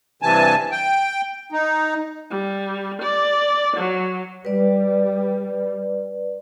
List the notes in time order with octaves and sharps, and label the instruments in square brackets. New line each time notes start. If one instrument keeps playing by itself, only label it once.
[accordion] G2 C3 E3 G#5 A5
G5
D#4
[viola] G3
D5
F#3
[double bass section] G3 [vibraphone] B4 D5